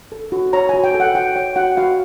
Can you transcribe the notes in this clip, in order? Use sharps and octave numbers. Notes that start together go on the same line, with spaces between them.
A4
F#4
C#5 A#5
G#5
F#4
G5
A4
F#5
F#4 G5
C#5 G5
F#4 F#5
F#4 F5